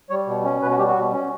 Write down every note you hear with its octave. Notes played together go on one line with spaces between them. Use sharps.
G3 C#5
B2
C#4
B2 B4
F#4
G3 G4
F#4
B2
C#4